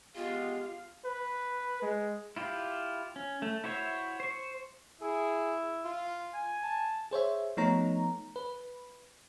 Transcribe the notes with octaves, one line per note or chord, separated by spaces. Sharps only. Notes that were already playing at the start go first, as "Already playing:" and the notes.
G#3 B3 F4 G4 F5
B4
G#3
E4 F4 G4
C#4
A3
E4 F#4 C5 C#5 E5
C5 C#6
E4 G#4
F4
G#5
A5
G#4 C5 C#5 E5
F3 A3 B3 D#4 C#5 A#5
B4